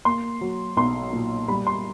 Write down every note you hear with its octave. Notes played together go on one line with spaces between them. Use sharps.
A#3 C6
F#3
B1 C6
A#2
G3 B5
C6